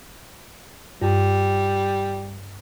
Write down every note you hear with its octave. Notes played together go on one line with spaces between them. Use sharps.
G2 G3